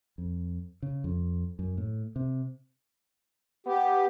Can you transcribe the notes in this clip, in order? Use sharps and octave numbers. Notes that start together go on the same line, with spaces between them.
F2
C#3
F2
F#2
A2
C3
B3 G4